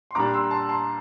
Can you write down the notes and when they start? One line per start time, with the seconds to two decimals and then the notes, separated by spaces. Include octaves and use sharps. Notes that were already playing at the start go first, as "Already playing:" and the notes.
0.11 C6
0.15 A#2 G3 D4 A#5 D6
0.33 C6 E6
0.51 A5 C6
0.69 A5 C6